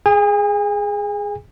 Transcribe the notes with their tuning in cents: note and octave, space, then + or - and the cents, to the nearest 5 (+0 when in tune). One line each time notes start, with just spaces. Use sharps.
G#4 +0 G#5 -40